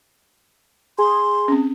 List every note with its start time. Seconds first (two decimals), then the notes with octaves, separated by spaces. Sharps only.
0.98 G#4 C6
1.48 C4 C#4